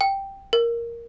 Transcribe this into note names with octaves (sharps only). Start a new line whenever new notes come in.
G5
A#4